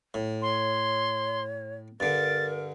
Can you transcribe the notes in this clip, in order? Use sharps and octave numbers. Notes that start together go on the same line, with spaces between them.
A2
C#5 C6
G2 D3 A#4 A6